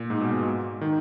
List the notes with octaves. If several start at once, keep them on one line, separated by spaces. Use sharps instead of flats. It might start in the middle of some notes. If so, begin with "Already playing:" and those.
Already playing: A#2
G#2
B2
G#3
D#3